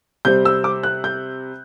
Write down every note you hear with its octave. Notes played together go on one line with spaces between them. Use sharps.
C3 G3 C4 G6
E6
D6
F#6
G6